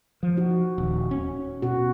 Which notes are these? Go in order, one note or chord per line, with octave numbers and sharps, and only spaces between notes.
F3
D#4 F#4
D#1
C#4
B2 F#4